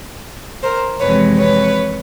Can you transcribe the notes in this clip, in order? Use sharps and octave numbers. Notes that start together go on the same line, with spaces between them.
A#4 C5
F2 C3 E3 G#3 C4 B4 C#5
B4 C#5